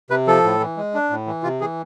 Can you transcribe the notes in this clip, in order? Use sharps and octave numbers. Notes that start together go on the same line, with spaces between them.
C3 B4
F3 A4
A2
E3
G#3
D4
A2
E3
C3 F4
E3 G#4